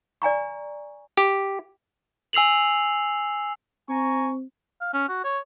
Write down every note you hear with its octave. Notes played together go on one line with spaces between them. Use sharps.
D5 G#5 A#5 C#6
G4
G#5 E6 C7 F7 F#7
C4 G#5 A#5 C#6
F5
C#4
F#4
C#5